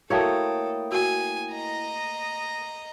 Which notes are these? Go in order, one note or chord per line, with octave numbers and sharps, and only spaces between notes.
A3 A#3 E4 F#4 A4 C#5 G5 D#6
F#4 G#5
D#5 A#5